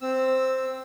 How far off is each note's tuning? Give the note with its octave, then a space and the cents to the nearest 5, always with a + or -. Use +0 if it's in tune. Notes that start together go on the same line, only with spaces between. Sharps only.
C4 +0 E6 +0